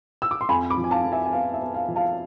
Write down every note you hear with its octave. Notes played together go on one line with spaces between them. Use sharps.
E6
D6
C6
F2 G#5 B5
B5 D6
F3
G#5
F5 A5
F2
E5 G#5
G#5
B3 F5
E5
B3
F5
F3
F5 A5